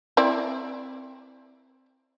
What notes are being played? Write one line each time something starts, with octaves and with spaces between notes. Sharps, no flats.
C4 E4 D5